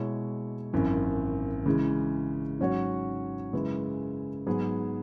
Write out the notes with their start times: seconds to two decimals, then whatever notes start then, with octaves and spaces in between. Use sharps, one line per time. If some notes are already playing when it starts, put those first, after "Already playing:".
Already playing: B2 G#3 E4 C#5
0.73 G#1 F#2 E3
1.66 C#3 E3 G#3
2.59 G#2 F#3 C#4 F#4 C#5
3.53 F#2 C#3 G#3 E4 B4
4.46 G#2 F#3 B3 G#4